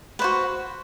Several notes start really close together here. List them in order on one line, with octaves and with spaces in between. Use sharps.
B4 C5 F#4